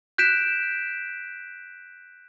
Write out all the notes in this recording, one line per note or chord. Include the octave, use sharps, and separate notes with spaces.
F#6 G6 B6 D7 E7